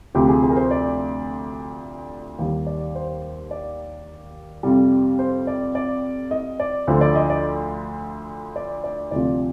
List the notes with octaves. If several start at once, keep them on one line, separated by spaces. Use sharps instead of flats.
D2 C3 F3 G4
G#4
G#4
A#4
C5
D5
D#2 D#3 G3
D5
C5
D5
F2 C3 G3
C5
D5
D5
D#5
D5
D2 D3 F3 C5
D5
D#5
D5
D5
D5
D2 C3 F3 D5